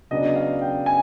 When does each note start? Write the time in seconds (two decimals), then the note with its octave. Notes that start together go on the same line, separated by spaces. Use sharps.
0.11 C#3 F#3 B3 D4 D#5
0.36 F5
0.62 G5
0.86 G#5